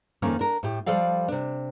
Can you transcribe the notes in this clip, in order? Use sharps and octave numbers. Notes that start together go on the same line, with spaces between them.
F2 D#3 A3 A#3 C#4
D4 A#4
A2 G4
F3 G3 A4 D5 F5
C3 D4